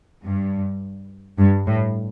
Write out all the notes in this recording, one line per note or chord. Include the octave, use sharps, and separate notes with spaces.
G2
G2
A2